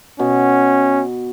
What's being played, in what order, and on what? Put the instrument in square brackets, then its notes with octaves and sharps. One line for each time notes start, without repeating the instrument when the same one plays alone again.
[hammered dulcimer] B2 [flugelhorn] C#4